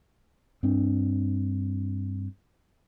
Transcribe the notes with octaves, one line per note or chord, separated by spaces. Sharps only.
G2 C4 D4